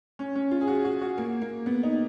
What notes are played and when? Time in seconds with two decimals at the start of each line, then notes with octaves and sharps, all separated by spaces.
0.19 C#4
0.35 C#4
0.51 F4
0.61 G#4
0.68 F#4
0.85 F#4
1.01 F#4
1.18 A#3
1.42 A#3
1.66 B3
1.83 D#4